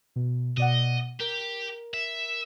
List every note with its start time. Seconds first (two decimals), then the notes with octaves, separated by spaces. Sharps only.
0.16 B2
0.57 B2 D5 D#5 F#5
1.20 G4 A#4
1.94 E5